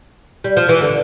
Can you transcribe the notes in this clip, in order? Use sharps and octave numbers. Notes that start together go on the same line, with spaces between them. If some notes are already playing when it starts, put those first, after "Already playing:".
G3
F3
E3
D3